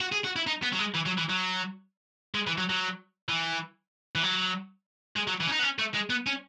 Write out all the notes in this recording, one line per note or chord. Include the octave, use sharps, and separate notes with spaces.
F#4
G#4
F#4
E4
D#4
B3
F#3
G#3
E3
F#3
E3
F#3
G#3
E3
F#3
F#3
E3
E3
F#3
G#3
F#3
E3
C#4
D#4
B3
C#4
A3
G#3
B3
C#4